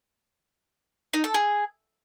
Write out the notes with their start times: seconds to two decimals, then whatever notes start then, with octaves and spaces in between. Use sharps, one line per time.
1.13 D#4
1.24 A4
1.34 G#4